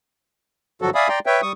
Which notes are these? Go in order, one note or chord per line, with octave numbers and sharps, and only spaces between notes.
G2 D3 F3 F#3 F#4 A4
D5 E5 F5 G#5 B5 D#6
D5 G5 A#5 C6
B4 C#5 E5 G5
G3 C#6 D#6